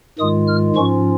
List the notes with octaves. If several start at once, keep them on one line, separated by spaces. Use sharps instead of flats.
G#2 D#3 G#3 F4 D#6
F6
G#2 F3 C#4 F4 C#6